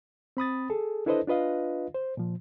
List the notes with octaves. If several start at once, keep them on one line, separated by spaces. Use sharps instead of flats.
C4 B5 D#6 A6
G#4 A4
D4 E4 A4 B4 C5 D#5
D4 F4 B4 D#5 F5
C5
A#2 F3